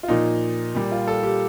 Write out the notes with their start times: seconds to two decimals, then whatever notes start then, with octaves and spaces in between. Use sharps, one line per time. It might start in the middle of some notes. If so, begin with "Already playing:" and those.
0.03 F4
0.08 A#2 F3 D#4
0.75 A#2 G3
0.92 F4
1.07 A4
1.23 G4